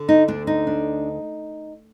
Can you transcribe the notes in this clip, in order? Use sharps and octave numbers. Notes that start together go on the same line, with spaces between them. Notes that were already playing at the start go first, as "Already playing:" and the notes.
Already playing: D3
D#4
D2 D4
D#4
D4